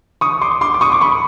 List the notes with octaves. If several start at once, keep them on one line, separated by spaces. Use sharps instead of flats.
C#6 D#6
C6 D6
C6 D6
D6
C#6 D#6
D6
B5 C#6